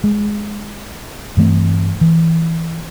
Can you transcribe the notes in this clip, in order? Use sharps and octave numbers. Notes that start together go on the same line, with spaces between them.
G#3
G2 E3 A3 C4
E3